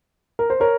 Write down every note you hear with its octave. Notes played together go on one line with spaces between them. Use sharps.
A#4
C5
A#4 C#5